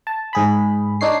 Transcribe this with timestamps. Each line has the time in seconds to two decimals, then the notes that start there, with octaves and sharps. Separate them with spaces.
0.07 A5
0.33 G#2 G#4 B5
1.01 D4 D#4 C#5 C7